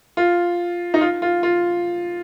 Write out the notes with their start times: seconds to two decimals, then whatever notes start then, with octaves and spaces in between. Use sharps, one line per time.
0.17 F4
0.94 D#4
1.01 F4
1.22 F4
1.43 F4